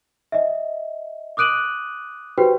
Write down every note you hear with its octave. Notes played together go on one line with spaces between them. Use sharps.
D#5 E5
D6 D#6 F#6 D7 D#7 F#7
F#4 G4 B4 C5 G5